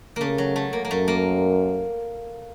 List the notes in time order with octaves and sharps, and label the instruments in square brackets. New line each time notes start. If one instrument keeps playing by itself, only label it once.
[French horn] C#3 [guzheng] A3 A#3
[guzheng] F#3
A3
A#3
A#3
[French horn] F#2 [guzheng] A3
[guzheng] A#3